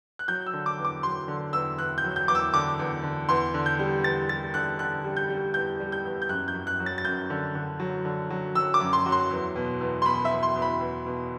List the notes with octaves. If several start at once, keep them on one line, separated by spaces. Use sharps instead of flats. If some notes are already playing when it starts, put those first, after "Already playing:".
F#6
F#3 G6
E6
D3
D6
E2
D6
F#3 C6
D3
E2 E6
E2 F#6
G6
F#3
G6
E2 D6
E6
D3 D6
E2
D3
E2 C6
D3
G6
G3
E2 A6
G3 A6
D3 F#6
D3 F#6
G3
G6
G3
E2 G6
G3
G6
E2
G6
F#2 F#6
G6
F#2
F#6
F#3
A6
A6
F#2 G6
D3
D3
F#3
D3
F#3
F#3 E6
D6
F#2
C6
F#3
C6
E2
B2
E2
C6
B2 B5
E5
E2
C6
E2
B5
E2
B2